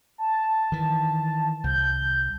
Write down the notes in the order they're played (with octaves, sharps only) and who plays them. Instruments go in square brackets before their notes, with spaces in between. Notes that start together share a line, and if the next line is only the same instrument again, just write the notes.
[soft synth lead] A5
[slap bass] D#3 E3
[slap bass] C2 [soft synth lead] G6